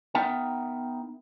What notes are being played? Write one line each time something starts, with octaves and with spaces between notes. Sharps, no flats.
B3 D#4 A#4 E5 F#5 G5